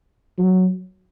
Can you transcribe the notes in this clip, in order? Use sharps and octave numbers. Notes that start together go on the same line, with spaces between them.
F#3